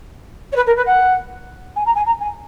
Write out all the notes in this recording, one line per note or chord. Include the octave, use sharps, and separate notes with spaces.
C#5
B4
A#4
B4
F#5
G#5
A#5
G#5
A#5
G#5